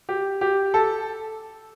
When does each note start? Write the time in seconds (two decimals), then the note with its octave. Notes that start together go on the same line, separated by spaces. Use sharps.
0.09 G4
0.41 G4
0.74 A4